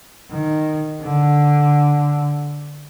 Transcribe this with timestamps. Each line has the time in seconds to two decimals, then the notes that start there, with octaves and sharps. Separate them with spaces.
0.31 D#3
1.03 D3